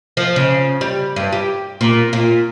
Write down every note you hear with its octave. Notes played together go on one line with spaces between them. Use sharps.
F3
C#3
G3
G2
G4
A#2
A#2